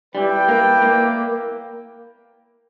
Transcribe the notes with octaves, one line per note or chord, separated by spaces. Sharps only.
G3 E4 B4 D5 G5
A#3
A#3